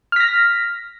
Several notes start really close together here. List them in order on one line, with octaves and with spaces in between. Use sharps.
F6 B6 A#6